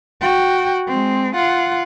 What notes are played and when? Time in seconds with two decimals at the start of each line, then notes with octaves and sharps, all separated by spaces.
0.21 F#4 G5
0.88 G#3 C4
1.35 F4 F#5